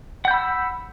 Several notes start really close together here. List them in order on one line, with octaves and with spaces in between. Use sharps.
F#5 G6 B5 E6